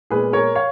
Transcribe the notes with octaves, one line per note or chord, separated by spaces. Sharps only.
A#2 G#3 B3 G#4 B4
A#4 C#5
C#5 F5